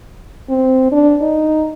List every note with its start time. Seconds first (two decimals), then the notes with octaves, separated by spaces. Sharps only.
0.49 C4
0.92 D4
1.22 D#4